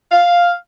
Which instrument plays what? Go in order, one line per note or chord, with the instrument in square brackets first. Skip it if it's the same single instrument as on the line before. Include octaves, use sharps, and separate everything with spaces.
[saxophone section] F5